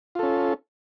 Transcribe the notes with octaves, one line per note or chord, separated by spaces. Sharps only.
C#4 F4 A4